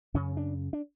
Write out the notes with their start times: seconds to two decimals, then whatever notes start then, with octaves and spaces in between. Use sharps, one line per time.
0.14 F#2 C#3 C#4
0.37 D4
0.73 D4